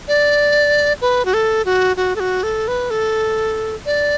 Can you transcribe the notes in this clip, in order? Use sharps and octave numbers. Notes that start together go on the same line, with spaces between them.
D5
B4
F#4
A4
F#4
F#4
A4
F#4
A4
B4
A4
D5